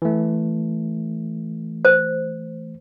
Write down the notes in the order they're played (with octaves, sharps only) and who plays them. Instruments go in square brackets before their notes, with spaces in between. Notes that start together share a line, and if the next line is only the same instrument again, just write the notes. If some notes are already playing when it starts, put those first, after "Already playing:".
[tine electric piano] E3 A3
[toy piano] C5